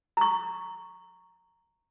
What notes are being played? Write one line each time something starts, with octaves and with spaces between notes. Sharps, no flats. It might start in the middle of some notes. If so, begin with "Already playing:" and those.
A#5 C#6